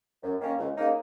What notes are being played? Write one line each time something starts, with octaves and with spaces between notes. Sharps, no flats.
F#2
D#3 A#3 C#4
C#2
C#3 A#3 D#4